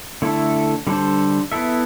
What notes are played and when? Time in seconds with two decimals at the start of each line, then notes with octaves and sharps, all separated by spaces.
0.22 D3 A3 E4 A4
0.87 D3 G3 D4 A4 C5
1.52 B3 E4 A4 E5